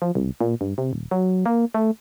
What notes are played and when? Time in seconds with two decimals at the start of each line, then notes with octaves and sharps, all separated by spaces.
0.02 F3
0.15 C2
0.41 A#2
0.61 G2
0.78 C3
0.93 D#1
1.11 F#3
1.46 A#3
1.74 A3